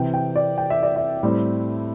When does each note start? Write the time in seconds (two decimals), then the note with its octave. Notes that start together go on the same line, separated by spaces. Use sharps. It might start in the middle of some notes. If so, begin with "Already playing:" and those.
Already playing: C3 E3 C4 G5
0.14 G5
0.36 D5
0.58 G5
0.70 E5
0.83 D5
0.96 E5
1.23 A2 G3 C4